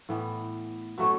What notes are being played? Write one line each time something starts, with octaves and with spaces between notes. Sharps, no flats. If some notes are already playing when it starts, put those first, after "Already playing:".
A2 E3 B3
B2 F#3 A3 C#4